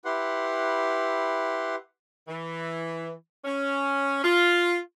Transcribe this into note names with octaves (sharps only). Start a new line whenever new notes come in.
E4 G4 B4 F#5 C6
E3
C#4
F4